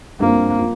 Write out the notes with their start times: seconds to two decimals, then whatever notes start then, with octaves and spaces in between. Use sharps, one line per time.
0.20 G2 F3 A#3 C4
0.59 F3